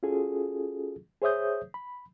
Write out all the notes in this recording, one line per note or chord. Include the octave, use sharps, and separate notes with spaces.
C#4 F4 F#4 G#4 A4
G#4 C5 C#5 E5 D#6 G6
B5